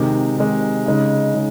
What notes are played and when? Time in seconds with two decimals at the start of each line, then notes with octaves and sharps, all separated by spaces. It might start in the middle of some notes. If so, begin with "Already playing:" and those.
Already playing: C3 D#3 G#3
0.38 C3 D#3 G#3
0.86 C#3 G#3 D#4
1.35 C#3 G#3 D#4